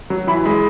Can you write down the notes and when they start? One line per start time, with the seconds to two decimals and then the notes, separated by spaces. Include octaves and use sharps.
0.10 F#3
0.27 E3 B5
0.45 G#3 B5